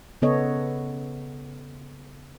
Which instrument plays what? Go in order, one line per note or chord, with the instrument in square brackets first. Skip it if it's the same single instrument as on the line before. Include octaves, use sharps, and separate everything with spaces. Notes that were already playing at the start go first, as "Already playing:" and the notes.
[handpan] C#3 B3 A4 C#5 D#5